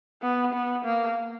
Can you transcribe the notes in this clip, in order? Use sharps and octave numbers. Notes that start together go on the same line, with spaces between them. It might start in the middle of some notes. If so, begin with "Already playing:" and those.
B3
B3
A#3